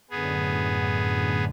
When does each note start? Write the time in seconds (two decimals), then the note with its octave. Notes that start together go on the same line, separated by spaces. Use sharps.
0.10 F#2 A2 D3 B3 G#4